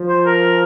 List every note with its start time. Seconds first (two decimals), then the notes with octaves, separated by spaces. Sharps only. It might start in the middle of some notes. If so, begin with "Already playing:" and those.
Already playing: F3
0.09 C5
0.26 A#4